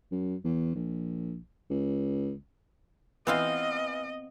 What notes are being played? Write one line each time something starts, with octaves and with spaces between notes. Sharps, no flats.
F#2
E2
A#1
C#2
E3 B3 C4 F4 D#5 F5